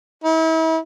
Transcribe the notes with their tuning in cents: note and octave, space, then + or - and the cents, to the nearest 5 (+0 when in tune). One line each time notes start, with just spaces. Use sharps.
E4 -40